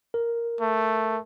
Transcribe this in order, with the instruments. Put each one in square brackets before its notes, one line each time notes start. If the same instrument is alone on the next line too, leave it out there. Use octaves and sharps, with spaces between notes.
[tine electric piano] A#4
[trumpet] A3